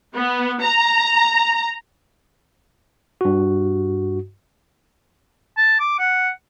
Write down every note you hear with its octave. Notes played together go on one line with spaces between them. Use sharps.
B3
A#5
G2 F#4
A5
D6
F#5